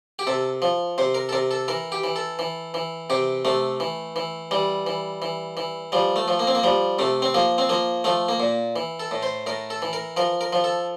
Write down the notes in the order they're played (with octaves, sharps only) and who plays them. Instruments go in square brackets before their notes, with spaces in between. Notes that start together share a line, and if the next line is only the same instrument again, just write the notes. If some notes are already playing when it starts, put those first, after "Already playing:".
[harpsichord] G4
C3 A4
F3
C3 C5
A#4
A4
C3 A#4
A4
E3 A#4
G4
E3
A4
E3
E3
C3 G4
C3 A3
E3
E3
E3 G3
E3
E3
E3
F3 G3
A3
F3
A#3
C4
A#3
F3 G3
C3 A3
C4
F3 A#3
C4
F3 A#3
F3 A3
A#3
A#2
E3
A4
A2
C5
A2 A#4
A4
E3
A#4
F3 A#4
A#4
F3
A4